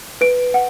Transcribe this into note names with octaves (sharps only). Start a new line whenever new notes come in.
B4 D7
F#5